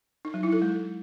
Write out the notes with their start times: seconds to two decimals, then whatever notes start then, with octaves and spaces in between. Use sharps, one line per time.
0.25 D#4
0.34 F#3
0.43 E4
0.52 A4
0.62 G#3